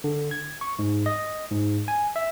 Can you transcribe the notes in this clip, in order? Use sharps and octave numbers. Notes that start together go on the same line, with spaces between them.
D3
G#6
C#6
G#2
D#5
G#2
G#5
E5